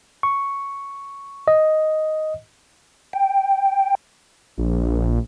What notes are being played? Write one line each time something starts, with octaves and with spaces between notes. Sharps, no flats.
C#6
D#5
G5
A#1